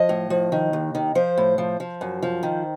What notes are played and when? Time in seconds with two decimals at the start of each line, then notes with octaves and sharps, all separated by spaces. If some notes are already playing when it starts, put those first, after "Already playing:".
Already playing: F3 D#5
0.09 A2
0.30 F3
0.52 D#3
0.73 D#2
0.95 D#3
1.15 F3 C5
1.37 A2
1.58 F3
1.80 F3
2.01 F#2
2.23 F3
2.43 D#3